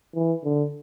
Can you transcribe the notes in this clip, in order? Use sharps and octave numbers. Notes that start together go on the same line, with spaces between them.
E3
D3